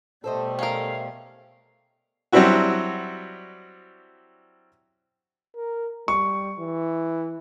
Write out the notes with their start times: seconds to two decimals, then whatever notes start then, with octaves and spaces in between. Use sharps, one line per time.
0.24 B2 G3 A3 A4 C5 D#5
0.59 C#4 A#4 F5
2.32 F#3 G3 C4 D4 E4 F#4
5.56 A#4
6.08 G3 C#6
6.59 E3